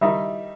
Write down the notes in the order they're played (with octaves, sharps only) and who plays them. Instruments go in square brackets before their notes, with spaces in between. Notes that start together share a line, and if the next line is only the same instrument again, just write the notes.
[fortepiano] D#3 G3 D#4 [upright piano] E5